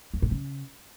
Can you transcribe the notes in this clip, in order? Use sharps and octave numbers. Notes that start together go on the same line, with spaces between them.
E2
A2
C#3